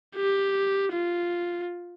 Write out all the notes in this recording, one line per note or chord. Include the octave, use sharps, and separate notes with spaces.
G4
F4